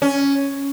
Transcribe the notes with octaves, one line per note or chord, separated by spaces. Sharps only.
C#4